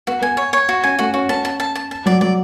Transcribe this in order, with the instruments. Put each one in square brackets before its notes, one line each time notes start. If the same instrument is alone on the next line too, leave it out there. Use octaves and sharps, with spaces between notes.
[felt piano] B3 [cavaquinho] F#4
[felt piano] B3 [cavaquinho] G#5
[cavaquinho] C#5
C#5
F#4
[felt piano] C#4 [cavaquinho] G#5
[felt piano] A3 [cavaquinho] F#4
[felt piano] C#4 [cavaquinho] F#4
[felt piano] C#4 [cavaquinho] A5
[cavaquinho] A5
A5
A5
A5
[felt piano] F#3 [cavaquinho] D5
[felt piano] F#3 [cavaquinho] D5